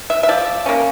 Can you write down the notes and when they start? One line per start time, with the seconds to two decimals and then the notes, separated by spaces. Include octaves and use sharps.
0.10 E5
0.23 E5
0.29 F3 D5
0.66 A#3 C#4